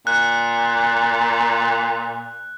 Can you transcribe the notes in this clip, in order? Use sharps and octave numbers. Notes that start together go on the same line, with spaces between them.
A#2 F#6